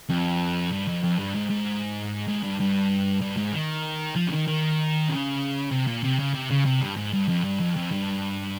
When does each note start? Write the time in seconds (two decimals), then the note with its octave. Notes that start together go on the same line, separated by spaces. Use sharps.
0.09 F2
0.72 G2
0.88 F2
1.03 F2
1.19 G2
1.34 G#2
1.50 G#2
2.28 G#2
2.44 G2
2.60 G2
3.21 G2
3.37 G#2
3.52 D#3
4.16 F3
4.28 C#3
4.31 D#3
4.47 D#3
5.09 C#3
5.71 C3
5.87 A#2
6.04 C3
6.19 C#3
6.34 C3
6.50 C#3
6.65 C3
6.81 G2
6.96 G#2
7.13 G2
7.28 F2
7.44 G2
7.59 F2
7.76 F2
7.91 G2